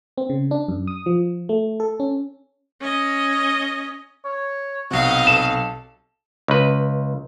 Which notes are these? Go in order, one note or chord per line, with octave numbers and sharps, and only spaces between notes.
C4
C#3
D4
F#2
D#6
F3
A3
A4
C#4
C#4 D#5
C#5
B1 C3 F#4 D#5 F5
A4 E7
C#2 B4